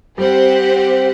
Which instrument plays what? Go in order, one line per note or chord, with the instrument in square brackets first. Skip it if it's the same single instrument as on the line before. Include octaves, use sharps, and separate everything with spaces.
[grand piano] G3 [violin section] C4 G4 C5 F#5